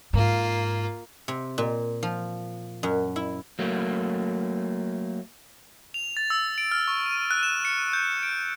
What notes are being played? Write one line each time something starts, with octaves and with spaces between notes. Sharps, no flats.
G#2 A#3 F4
C3
A#2
F3
F#2
E4
F#3 A3 A#3
F7
A6
E6
D7
F6
C#6
D#7
F#6
E7
C#7
G6
D7